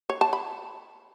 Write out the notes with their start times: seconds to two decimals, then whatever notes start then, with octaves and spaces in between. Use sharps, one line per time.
0.10 C#5
0.21 A5
0.33 B5